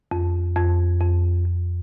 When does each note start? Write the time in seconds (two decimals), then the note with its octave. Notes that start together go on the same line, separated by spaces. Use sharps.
0.11 F2
0.56 F2
1.00 F2
1.46 F2